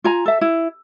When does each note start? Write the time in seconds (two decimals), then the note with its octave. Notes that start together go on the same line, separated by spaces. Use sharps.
0.04 F4 G#5 A#5
0.25 A4 E5
0.41 E4